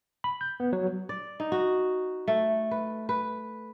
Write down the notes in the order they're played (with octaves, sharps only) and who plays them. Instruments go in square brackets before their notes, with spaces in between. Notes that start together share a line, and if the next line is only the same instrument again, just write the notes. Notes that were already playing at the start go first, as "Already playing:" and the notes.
[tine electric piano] B5
G6
B3
F#3
[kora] D5
D#4
F#4
A3
B4
B4